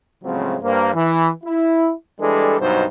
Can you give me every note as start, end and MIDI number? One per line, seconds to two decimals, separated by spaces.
0.24 0.56 45
0.24 0.56 49
0.24 0.56 53
0.24 0.56 54
0.24 0.56 56
0.24 0.56 60
0.62 0.93 43
0.62 0.93 58
0.62 0.93 72
0.94 1.29 52
1.44 1.92 64
2.19 2.59 52
2.19 2.59 55
2.19 2.59 56
2.19 2.59 62
2.19 2.59 69
2.60 2.84 36
2.60 2.84 43
2.60 2.84 47
2.60 2.84 54
2.60 2.84 63
2.60 2.84 72